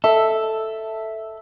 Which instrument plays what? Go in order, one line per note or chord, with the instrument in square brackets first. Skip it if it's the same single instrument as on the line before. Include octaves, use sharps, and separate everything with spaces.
[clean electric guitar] A4 [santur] E5